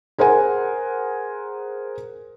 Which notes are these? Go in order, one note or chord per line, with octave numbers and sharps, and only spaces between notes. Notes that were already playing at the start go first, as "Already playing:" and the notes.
G#4 A#4 C5 F#5 G#5